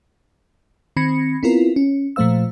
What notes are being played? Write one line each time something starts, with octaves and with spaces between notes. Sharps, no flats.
D#3 C4 B5 G#6 A#6 C#7
B3 C4 E4 F4 A#4 B4
C#4
A#2 F3 A3 C5 F5 E6